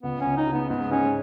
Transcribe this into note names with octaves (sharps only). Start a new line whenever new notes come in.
C#2 B3
C#2 C#4
D#4
C#3
B3
G#2 B3
G#2 C#4